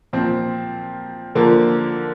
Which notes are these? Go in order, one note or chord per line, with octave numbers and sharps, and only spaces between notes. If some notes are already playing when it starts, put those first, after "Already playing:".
A#2 F3 C4
D3 F3 A#3